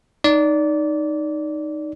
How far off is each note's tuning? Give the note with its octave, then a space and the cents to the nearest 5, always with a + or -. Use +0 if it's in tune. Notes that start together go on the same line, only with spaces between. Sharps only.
D#4 -10 D5 -20